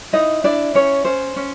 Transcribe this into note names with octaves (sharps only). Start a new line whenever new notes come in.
D#4 E4 D#5
D4 E4 D5
C#4 E4 C#5
C#4 C5
C#4